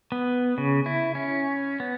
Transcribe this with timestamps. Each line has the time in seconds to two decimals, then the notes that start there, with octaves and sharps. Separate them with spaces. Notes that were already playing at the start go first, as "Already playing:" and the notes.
0.12 B3
0.58 C#3
0.86 E4
1.15 C#4
1.80 B3